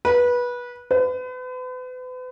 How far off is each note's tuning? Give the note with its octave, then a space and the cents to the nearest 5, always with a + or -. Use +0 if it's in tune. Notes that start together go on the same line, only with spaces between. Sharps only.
B4 -20
B4 +40